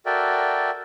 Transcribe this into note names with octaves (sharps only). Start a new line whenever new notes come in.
F#4 A4 A#4 D5 E5 G5